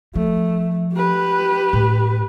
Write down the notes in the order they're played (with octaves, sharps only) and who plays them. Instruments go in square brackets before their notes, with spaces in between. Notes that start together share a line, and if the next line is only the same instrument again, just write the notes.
[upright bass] F3 [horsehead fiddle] A3
[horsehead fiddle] G4 B4
[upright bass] A2